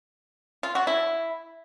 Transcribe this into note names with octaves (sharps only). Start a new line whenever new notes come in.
F4
F#4
E4